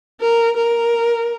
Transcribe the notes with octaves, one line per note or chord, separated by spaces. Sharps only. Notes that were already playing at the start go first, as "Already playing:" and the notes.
A#4
A#4